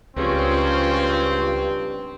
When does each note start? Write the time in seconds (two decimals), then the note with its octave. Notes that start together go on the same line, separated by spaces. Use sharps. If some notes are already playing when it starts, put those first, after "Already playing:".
0.17 C#2 G2 F3 C4 C#4